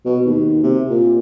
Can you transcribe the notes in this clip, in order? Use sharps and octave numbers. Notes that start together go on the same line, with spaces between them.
B2
D#2
C3
A#2